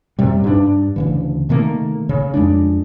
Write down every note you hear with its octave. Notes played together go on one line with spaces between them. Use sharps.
F#2 C3 G3
G2 D4
D2 C#3 E3
C3 D#3 A3 A#3
C#3
F2 G#3 D4